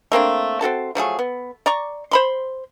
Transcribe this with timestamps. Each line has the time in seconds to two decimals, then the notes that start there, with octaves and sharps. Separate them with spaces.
0.12 A3 A#3 C4 D4
0.61 C4 F#4 A4 A5
0.95 F3 F#3 A3 G#4
1.19 B3
1.66 D5 A#5 C#6
2.11 C5 B5 C6